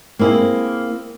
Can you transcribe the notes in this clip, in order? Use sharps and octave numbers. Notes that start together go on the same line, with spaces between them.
A#3 C4 E4 G#4